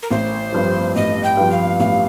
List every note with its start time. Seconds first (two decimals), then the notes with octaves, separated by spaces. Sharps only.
0.03 A#4
0.10 A1 C5
0.52 G2 F3
0.95 A1 D#5
1.24 G5
1.37 G2 F3
1.51 F5
1.80 A1 F5